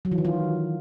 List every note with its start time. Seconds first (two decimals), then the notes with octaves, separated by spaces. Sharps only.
0.05 F#3
0.11 E3
0.18 D#3
0.25 F4